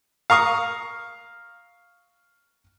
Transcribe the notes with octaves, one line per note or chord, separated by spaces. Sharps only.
F5 A#5 C#6 D#6